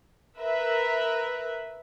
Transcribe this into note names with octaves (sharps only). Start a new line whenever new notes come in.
A#4 B4 E5